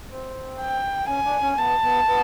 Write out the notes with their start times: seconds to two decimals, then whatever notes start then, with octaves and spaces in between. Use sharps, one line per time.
0.10 C4
0.60 G5
1.08 C#4 G#5
1.25 D4
1.42 C#4
1.58 B3 A5
1.83 B3
2.07 B3